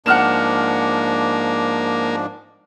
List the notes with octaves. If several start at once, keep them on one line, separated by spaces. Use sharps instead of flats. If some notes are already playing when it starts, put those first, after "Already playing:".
G#2 F3 A#3 D4 F#5 F6 E7